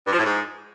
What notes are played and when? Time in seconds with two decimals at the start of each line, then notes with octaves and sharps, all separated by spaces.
0.07 G2
0.12 F3
0.18 A2
0.24 G#2